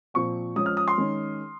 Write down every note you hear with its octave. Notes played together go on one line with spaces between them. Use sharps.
A#2 F3 C4 C#6
F3 G#3 C#4 D#6
F6
D#6
C6
D#3 G#3 C#4